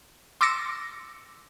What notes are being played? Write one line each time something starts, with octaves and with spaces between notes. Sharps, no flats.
C6 D6 E6 A6 A#6 C#7